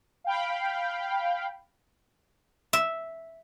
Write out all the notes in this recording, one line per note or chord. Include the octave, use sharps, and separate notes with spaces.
F5 G5 B5
E5